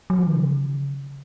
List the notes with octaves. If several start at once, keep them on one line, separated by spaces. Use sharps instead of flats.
F#3
F3
D#3
C#3